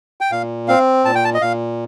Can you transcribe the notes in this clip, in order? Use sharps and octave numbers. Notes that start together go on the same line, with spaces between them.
G5
A#2 F5
C4 F5
A#2 A5
G5
A5
D#5
A#2 F5